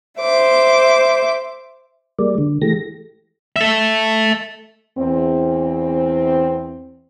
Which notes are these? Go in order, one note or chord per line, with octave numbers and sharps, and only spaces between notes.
C5 E5 D6
G3 G#3 A#3 D5
D3
E3 G#3 A3 G4 A4 A#6
A4 E5
E2 C4